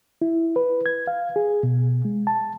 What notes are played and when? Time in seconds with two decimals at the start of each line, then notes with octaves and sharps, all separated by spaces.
0.22 E4
0.56 B4
0.86 G#6
1.07 F5
1.36 G#4
1.63 B2
2.05 G#3
2.27 A5